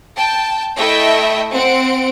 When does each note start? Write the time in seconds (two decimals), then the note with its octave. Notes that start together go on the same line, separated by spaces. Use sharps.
0.16 G5 A5
0.77 A3 E4 D#5 E5 G5
1.52 C4 F#5 D7